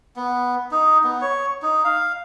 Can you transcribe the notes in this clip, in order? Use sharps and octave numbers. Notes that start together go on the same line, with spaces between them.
B3
D#4
B3
C#5
D#4
F5